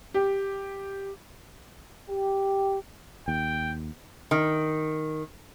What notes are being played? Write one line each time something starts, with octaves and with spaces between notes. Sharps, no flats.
G4
G4
D#2 G5
D#3